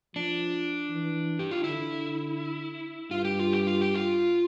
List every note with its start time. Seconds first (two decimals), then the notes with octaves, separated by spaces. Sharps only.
0.15 F3 D4
0.90 E3
1.39 G4
1.51 F4
1.64 D3 E4
3.11 G2 F4
3.25 G4
3.40 F4
3.53 G4
3.67 F4
3.81 G4
3.94 F4